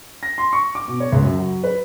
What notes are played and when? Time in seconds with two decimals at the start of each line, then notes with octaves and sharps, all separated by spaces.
0.23 A#6
0.38 C6
0.53 C#6
0.75 D6
0.88 B2
1.00 C#5
1.12 C#2
1.24 F#2
1.38 F#3
1.64 B4